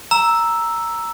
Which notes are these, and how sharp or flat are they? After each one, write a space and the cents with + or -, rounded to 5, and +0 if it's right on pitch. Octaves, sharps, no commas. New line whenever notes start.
A#5 +0 E6 +0